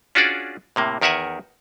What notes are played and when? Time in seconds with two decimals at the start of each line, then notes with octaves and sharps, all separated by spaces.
0.15 C#4 D4 F4 F#4 G#4 D5
0.76 A2 C3 A#3
1.01 E2 D#3 A#4 E5 F#5 G#5